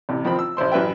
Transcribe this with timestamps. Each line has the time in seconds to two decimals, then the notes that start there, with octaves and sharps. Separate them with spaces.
0.09 A1 C3
0.25 F2 D#3 C4 B5
0.39 E6
0.57 A1 E4 C5 C6
0.72 A1 F#2 B4 E5 G5